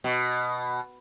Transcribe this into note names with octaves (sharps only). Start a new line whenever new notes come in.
B2